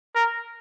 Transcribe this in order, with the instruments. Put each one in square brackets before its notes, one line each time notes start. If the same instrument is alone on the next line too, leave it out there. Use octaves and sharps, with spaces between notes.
[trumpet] A#4